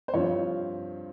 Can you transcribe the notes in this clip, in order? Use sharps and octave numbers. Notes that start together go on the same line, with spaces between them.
C5
G2 F3 C4 F4 C#5